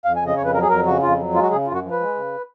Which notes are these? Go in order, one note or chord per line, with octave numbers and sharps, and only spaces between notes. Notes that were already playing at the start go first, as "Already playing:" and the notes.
F2 F5
G#5
C#3
D#5
F2 C#5
B4
F#3 A#4
G#4
F2 A#4
C#3 F#4
F2 F4
F#3
G#3 F4
F#4
C#3 G#4
F#2 F4
F#4
F3
B4
G#3
C#3